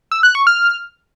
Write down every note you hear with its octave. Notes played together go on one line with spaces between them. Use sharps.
E6
F#6
C#6
F6